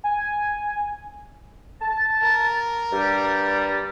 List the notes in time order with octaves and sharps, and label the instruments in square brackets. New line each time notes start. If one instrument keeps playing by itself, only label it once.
[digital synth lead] G#5
[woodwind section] A5
[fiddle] A#4
[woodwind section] G2 G3